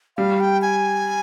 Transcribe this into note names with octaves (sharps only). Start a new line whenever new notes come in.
G3 F5
G5
G#5